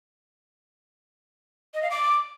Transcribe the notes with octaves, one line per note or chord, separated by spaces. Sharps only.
D#5
F5
D6